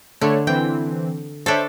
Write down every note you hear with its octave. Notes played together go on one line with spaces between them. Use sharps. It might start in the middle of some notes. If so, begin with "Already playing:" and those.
D3 A3 C#5
E3 C4 G5
D4 A4 C5 C#5 E5